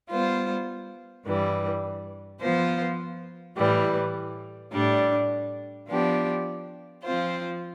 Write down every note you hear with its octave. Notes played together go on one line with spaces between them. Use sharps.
G3 B3 F4 C5
G2 E3 G3
F3 B3 F4 C5
A2 E3 G3
A2 G3 D4
F3 B3 D4 G4
F3 C4 F4 C5